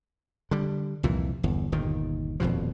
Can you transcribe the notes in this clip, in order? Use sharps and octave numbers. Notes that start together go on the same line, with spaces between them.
D3 G3
C2 F2 A#2 E3
G1 E2
G1 D#2 A#2 D#3
D#1 F2 B2 F3